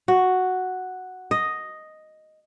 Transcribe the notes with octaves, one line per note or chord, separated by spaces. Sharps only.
F#4
D#5